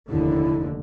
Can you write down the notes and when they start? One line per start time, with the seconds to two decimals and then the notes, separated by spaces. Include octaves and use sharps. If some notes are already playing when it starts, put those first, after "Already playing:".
0.10 F1 D#2 D3 E4